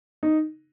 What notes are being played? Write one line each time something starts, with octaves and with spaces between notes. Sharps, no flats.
D#4